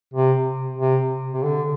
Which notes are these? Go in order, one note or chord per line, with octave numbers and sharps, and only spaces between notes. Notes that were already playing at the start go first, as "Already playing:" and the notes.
C3
C3
C3
D3